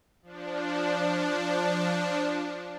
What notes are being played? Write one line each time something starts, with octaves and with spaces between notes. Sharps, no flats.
F3 D4